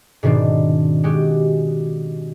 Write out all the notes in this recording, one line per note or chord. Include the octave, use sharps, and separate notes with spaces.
G#2 B2 D#3 C4 D4
G#3 F#4 G4